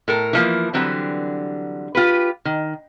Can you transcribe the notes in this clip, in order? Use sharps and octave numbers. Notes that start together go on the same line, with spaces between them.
A2 A4 A#4
E3 F3 A#3
D3 E3 F#3 G3 C4
F4 G4 B4
D#3